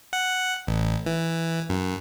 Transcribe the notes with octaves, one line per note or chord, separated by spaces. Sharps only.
F#5
A1
E3
F#2